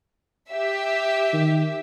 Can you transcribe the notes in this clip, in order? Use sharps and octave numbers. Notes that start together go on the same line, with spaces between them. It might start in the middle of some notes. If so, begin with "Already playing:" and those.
G4 E5
D#3